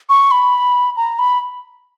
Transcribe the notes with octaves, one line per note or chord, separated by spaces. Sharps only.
C#6
B5
A#5
B5